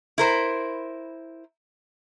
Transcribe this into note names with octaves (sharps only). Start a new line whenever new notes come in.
E4 A#4 C5